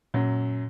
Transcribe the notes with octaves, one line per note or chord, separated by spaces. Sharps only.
F#2 A#2 F#3